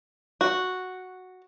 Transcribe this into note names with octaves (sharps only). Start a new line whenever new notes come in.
F#4